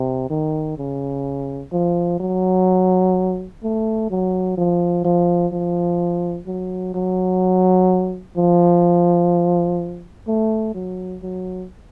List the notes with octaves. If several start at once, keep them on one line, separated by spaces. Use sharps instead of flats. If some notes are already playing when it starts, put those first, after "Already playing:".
Already playing: C3
D#3
C#3
F3
F#3
A3
F#3
F3
F3
F3
F#3
F#3
F3
A3
F#3
F#3